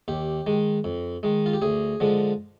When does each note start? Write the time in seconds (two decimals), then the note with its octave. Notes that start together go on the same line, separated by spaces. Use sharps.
0.08 D#2 G4
0.46 D#3 G#3
0.84 F2
1.23 D#3 G#3
1.46 F4
1.53 G4
1.62 D2 G#4
2.00 D3 F3 G#3